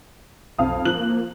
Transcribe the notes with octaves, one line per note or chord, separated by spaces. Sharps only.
B1 F2 F5 D#6
F3 A#3 F#6 F#7